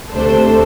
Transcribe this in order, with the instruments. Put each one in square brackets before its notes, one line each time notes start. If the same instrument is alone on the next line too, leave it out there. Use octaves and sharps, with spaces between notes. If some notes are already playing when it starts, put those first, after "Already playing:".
[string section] D2 C3 A3 D4 C5 [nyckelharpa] A4